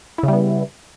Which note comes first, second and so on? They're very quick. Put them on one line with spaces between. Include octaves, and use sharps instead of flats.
E4 C#3 G3 B3